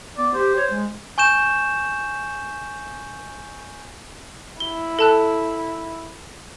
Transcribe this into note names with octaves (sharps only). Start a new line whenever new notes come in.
B3 D5
G4 C5
C#5
G#3
G#5 C#6 G6 E7
E4 G7
A4 A5 F#6